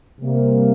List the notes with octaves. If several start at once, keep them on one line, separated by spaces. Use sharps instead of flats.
C3 G3 A#3